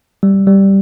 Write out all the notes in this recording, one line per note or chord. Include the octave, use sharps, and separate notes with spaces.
G3
G3